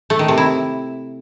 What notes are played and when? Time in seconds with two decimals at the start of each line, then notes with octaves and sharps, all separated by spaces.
0.10 A3
0.19 D#3
0.28 C3
0.38 E4